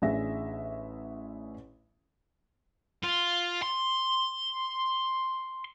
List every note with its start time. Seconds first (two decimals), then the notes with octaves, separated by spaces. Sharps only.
0.02 A1 D4 G#4 E5 A#6
3.04 F4
3.62 C6